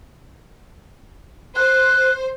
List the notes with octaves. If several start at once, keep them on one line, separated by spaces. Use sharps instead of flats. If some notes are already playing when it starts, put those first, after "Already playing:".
C5 F#6